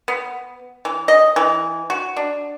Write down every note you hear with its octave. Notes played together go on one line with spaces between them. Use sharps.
B3
E3
D#5
E3
F#4
D4